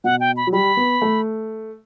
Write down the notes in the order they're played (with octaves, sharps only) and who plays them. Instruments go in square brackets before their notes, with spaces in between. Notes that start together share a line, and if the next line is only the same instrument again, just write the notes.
[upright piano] B2 [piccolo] F#5
[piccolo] G5
B5
[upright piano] F#3
[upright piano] G3 [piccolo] B5
[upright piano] B3
A3